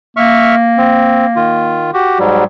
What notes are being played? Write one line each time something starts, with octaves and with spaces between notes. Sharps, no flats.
A#3 E5 C#6 F6
C4
D#3 F4
F#4 G4
G#2 F#3 G3